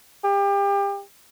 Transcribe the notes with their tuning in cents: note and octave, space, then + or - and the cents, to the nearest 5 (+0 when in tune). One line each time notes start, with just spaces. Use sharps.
G4 +30